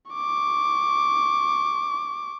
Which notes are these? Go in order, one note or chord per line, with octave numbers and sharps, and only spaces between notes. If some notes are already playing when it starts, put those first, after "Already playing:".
C#6 D6